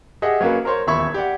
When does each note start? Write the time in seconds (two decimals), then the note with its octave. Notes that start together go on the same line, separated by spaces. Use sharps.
0.22 G4 G#4 D#5 E5 F#5
0.41 F#3 A#3 C#4 F#4 B4
0.65 A#4 C5 C#5 C6
0.87 D#1 E2 E5 B5 C#6 G#6
1.14 G4 D5 F#5